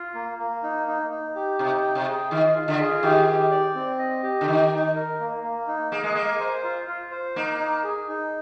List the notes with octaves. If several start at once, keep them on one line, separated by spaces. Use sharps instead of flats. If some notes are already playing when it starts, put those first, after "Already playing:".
Already playing: F4
A#3
A#3
D#4
D#4
D#4
G4
C3 D#4
G5
C3
G#4
D#3 F4
F4
D3
G#4
D#3 G4
G4
D5
C4
D#5
G4
D3
D#3 D#4
D#4
A#4
A#3
A#3
D#4
A#3 G#4
G#3
A#3 G#5
C5
F4
F4
C5
A#3 D#4
D#4
G#4
D#4